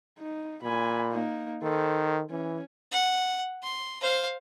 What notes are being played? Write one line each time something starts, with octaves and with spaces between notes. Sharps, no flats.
D#4
A#2 G#5 B5
A#3 D#4
D#3 A4 C5
E3 C#4
F#5
C6
C5 F5